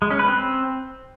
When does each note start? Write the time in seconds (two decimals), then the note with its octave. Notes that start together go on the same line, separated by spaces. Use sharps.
0.02 G#3
0.10 C#4
0.19 B4
0.28 C4